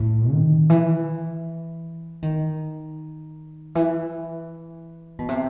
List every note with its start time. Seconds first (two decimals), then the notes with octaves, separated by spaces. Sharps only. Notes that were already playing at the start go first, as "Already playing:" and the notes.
Already playing: A2
0.31 D#3
0.70 E3
2.22 D#3
3.75 E3
5.19 B2
5.29 C3